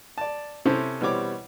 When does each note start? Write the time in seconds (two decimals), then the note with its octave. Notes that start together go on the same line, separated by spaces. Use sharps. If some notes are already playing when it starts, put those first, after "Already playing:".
0.18 D5 A5
0.66 C3 C#4 E4 A4 C5
1.01 B2 E3 G3 C4 C#5 D6